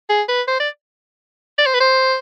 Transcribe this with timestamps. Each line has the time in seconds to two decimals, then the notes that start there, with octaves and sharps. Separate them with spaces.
0.09 G#4
0.28 B4
0.47 C5
0.60 D5
1.58 D5
1.66 C5
1.74 B4
1.80 C5